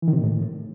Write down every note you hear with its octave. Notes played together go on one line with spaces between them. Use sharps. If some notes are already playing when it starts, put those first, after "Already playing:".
E3
D#3
C3
A#2
A2